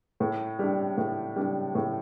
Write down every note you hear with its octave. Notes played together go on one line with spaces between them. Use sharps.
A2
G3 D4
A2
G3 D4
A2